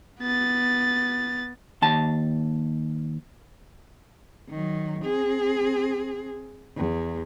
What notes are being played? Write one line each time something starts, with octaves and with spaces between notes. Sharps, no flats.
B3 A6
D#2 A5
D#3 F#3
C4 G#4
E2